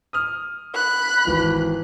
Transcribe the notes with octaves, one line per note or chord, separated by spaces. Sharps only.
D#6 F6
B5 F#6
G#1 E3 B4